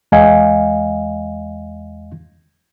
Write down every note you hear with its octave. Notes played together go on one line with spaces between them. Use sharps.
E2 G#3 D#5 F5 G#5